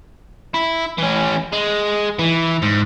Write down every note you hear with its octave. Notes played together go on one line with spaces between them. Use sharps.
E4
E3 C#4
G#3
E3
G#2